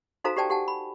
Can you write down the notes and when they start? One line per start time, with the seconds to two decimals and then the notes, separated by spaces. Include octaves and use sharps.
0.24 D#4 F#4 A4 C5 F5 A#5
0.37 G4 C5 D5 G5 A5
0.50 G4 F#5 G#5 A5
0.68 B5